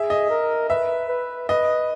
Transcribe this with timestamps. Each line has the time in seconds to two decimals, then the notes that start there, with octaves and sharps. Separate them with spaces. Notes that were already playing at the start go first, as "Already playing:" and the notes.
Already playing: G#4 E5
0.10 D#5
0.30 A#4
0.70 B4 E5
1.09 B4
1.49 B4 D#5